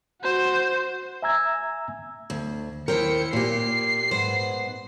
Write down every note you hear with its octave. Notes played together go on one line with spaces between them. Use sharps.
F#4 C5
E5 G#5 A#5 E6 G#6
D2
D#2 E4 A#4 C5 G5 C#7
A#2 A#3 G4 C7
G#2 B3 C5